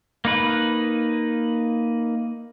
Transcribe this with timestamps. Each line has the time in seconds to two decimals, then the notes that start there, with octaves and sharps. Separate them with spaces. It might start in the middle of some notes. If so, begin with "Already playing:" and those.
0.25 A#3 D#4 B4